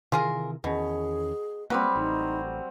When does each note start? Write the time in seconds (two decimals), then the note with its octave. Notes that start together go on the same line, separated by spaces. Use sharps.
0.12 C3 D#3 E3 F4 G#4 A#4
0.64 E2 B2 D#3 C#4 G#4
1.70 F#3 G3 A#3 C4 B4
1.96 A1 D#4